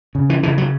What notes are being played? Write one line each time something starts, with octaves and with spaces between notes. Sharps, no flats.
C#3
E3
C#3 E3
F#3